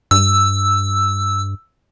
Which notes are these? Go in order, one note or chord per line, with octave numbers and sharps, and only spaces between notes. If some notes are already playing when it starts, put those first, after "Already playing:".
G2 E6